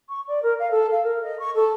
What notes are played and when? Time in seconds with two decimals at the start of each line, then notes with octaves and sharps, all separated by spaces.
0.09 C#6
0.28 D5
0.42 A#4
0.59 F5
0.71 A4
0.91 F5
1.03 A#4
1.23 D#5
1.39 C#6
1.55 A4